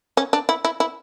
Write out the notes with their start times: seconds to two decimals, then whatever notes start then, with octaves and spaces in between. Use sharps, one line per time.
0.17 C#4
0.33 D4
0.49 E4
0.65 E4
0.80 E4